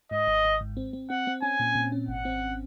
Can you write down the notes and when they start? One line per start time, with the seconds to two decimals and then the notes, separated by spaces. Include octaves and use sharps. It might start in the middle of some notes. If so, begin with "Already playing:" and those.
0.11 G#2 D#5
0.27 G#1
0.45 G#1
0.61 G#2
0.77 C4
0.93 C4
1.10 C4 F#5
1.27 C4
1.42 C#4 G#5
1.60 A#2
1.75 A#2
1.92 C#4
2.08 G#1 F#5
2.25 C4